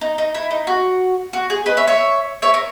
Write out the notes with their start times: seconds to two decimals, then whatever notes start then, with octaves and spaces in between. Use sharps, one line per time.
0.01 D#4
0.18 D#4
0.34 E4
0.51 D#4
0.67 F#4
1.33 F#4
1.50 G#4
1.66 B4 D#5
1.77 C#5 E5
1.87 C#5 E5
2.42 C#5 E5
2.54 A#4 C#5